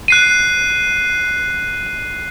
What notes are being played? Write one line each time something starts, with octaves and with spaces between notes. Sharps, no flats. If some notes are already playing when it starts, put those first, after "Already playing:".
F#6 C7 D#7